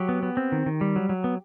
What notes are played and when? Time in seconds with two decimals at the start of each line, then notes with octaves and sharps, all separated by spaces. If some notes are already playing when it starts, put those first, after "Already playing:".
Already playing: F#3 G4
0.09 B3
0.23 B3
0.37 C4
0.52 D#3
0.66 D#3
0.81 G3
0.96 F#3
1.09 F#3
1.24 B3